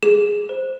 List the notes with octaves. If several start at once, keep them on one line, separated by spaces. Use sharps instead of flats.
G#4 E7
C5